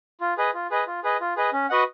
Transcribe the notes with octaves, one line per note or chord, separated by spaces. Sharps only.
F4
G#4 B4 D#5
F4
G#4 B4 D#5
F4
G#4 B4 D#5
F4
G#4 B4 D#5
C#4
F#4 B4 D#5 F#5